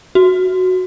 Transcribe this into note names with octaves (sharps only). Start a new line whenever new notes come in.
F#4